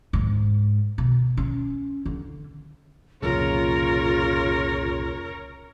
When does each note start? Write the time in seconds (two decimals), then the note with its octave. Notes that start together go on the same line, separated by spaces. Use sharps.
0.13 G#2
0.98 B2
1.37 C#4
2.05 D3
3.23 C2 F2 A#2 C#3 F4 A#4 C#5